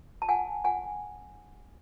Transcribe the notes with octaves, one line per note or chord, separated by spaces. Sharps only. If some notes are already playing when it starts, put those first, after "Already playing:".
A5
F#5 G#5
F#5 G#5